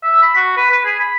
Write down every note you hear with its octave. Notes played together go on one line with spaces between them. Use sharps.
E5
B5
F#4
B4
B4
G#4
B5